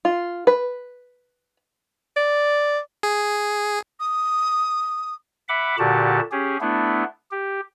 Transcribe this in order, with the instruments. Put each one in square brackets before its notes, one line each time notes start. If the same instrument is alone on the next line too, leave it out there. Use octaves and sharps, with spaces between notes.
[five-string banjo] F4
B4
[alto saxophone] D5
[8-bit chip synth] G#4
[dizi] D#6
[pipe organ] E5 F#5 B5 D6
A#2 D3 F#4 G4 A5
C#4 G4 G#4
A3 B3 D4 E4
G4